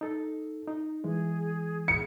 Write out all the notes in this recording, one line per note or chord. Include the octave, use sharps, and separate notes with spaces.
D#4 A4
D#4
E3 G#3 G#4
C#7